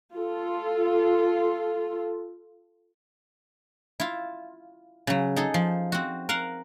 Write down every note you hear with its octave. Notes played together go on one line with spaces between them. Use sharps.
F4 A4
E4 F4
C#3 F#3
D#4 G#4 A4
F3
C4 F#4
A#4 F5 F#5